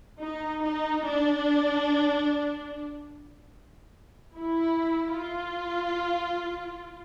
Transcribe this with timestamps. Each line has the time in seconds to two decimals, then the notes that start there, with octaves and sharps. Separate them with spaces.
0.23 D#4
0.64 D#4
1.05 D4
4.35 E4
5.17 F4